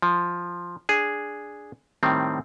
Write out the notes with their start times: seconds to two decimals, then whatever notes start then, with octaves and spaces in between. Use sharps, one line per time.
0.02 F3
0.89 D4 G#4
2.03 A2 D#3 G3 C4